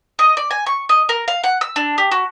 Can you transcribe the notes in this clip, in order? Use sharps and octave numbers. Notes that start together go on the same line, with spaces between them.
D#5
D5
G#5
C#6
D#5
A#4
F5
F#5
E6
D4
G4
F#4